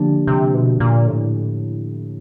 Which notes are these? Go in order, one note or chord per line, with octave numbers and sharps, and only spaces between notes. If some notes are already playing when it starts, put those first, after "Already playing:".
Already playing: D3 F3 A#3 D4 G4
C3
B2
A#2
A2